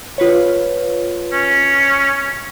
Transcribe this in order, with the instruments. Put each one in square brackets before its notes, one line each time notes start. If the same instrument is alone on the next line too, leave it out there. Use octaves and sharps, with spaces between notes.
[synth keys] F4 B4 C#5
[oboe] C#4